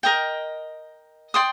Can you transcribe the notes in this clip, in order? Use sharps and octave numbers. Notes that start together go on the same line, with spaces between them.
A#4 D#5 G5
D5 G5 C6 D#6